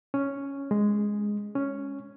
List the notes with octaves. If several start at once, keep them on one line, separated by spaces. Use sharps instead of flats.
C#4
G#3
C#4